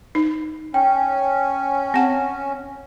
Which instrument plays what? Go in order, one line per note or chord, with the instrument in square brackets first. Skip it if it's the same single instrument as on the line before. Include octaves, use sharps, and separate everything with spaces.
[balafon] D#4
[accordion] C#4 [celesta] G5
[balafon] C4 F#5